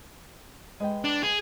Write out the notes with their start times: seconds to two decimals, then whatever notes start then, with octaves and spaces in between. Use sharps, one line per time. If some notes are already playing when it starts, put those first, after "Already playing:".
0.80 G#3 B4 G5
1.04 D4
1.23 G#4